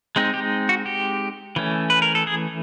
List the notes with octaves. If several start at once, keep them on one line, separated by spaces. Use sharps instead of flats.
G#3 C4 D#4
G4
F#4
G4
E3 A3 C#4
B4
A#4
A4
G#4